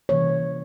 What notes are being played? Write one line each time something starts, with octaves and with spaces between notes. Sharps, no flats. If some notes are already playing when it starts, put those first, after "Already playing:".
C3 E3 G3 A#3 C#5